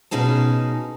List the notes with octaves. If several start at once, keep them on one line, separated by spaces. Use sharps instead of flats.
B2 C#4 D#4 G#4 A5